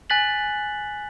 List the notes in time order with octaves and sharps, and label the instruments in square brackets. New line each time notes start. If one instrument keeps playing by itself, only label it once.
[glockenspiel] G#5 F#6 A6 B6 F#7